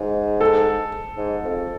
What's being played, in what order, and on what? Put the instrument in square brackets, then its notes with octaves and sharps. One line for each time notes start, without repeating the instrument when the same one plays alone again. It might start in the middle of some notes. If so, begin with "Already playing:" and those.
Already playing: [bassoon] G#2
[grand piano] A4
[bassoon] G#2
F2